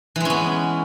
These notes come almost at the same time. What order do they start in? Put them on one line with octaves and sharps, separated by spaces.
E3 G#3 C#4 B3